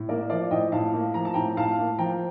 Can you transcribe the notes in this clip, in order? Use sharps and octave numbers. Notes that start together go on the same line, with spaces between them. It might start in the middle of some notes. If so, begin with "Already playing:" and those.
Already playing: A2
A#3 A#4 D5
F3 D5 F5
A2 D#5 G5
A2 F5 A5
A#3
F3 A#5
A5
A2 G5 A#5
A2 F5 A5
A#3
F3 G5 A#5